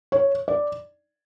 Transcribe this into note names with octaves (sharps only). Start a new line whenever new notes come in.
C#5
D5